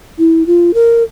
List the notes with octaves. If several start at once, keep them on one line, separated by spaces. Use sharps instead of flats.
E4
F4
A#4